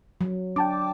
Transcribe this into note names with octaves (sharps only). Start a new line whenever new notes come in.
F#3
D4 G5 A5 D6